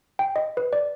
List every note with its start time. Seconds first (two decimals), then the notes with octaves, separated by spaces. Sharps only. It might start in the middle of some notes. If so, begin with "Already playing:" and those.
0.19 G5
0.36 D#5
0.57 B4
0.73 D5